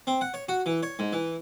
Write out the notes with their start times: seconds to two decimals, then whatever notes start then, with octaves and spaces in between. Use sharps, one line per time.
0.07 C4
0.21 F#5
0.34 C#5
0.49 F#4
0.66 E3
0.83 C#5
0.99 G#2
1.13 E3